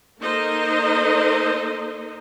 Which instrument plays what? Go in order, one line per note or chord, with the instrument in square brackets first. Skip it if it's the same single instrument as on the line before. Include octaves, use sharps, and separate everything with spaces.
[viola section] A#3 D#4 A4 A#4 C5 D#5